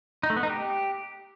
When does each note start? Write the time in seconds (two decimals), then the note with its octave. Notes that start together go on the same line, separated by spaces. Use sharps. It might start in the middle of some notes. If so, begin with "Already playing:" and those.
0.23 D#4
0.30 A3
0.36 B3
0.43 D#4
0.50 G4